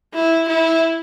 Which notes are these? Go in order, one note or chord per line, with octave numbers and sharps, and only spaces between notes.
E4
E4